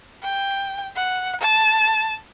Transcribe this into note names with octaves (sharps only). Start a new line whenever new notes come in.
G5
F#5
A5